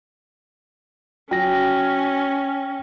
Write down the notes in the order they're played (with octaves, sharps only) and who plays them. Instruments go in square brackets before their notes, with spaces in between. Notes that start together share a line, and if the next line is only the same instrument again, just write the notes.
[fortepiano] F#3 [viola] C#4 [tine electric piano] G5 A#6